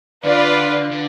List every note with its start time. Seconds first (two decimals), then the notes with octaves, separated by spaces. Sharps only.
0.25 D3 F4 B4 D5
0.92 D3